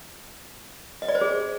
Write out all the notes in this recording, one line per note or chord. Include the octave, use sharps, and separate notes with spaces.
D#5
D5
C5
G#4